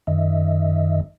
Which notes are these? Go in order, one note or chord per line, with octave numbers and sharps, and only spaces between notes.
F#2 D#3 D#5 E5